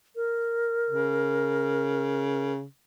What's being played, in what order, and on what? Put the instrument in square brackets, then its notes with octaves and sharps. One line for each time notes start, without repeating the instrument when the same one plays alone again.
[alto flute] A#4
[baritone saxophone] C#3